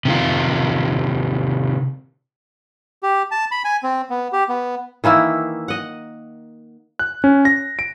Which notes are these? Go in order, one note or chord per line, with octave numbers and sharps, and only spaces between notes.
C3 D#3 F4
G4
A5
B5
G#5
C4
B3
G4
B3
D#3 E3 A#3 E4
D#5 F#5
F#6
C#4
A#6
D7